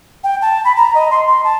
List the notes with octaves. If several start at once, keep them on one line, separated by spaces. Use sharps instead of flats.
G5
A5
B5
A#5
D#5
C6
C6
A5